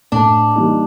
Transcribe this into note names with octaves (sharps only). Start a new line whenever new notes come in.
A2 D4
E3 G3 A#3 D#4